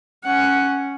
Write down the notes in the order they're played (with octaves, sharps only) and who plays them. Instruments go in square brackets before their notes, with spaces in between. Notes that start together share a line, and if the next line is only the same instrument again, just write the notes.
[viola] C#4 F#5